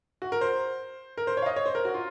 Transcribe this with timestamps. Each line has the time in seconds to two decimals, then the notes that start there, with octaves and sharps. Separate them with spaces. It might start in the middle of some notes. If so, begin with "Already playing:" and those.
0.22 F#4
0.32 A#4
0.41 C5
1.18 A#4
1.27 C5
1.37 C#5
1.42 F5
1.46 D#5
1.56 C#5
1.66 C5
1.75 A#4
1.85 F#4
1.94 F4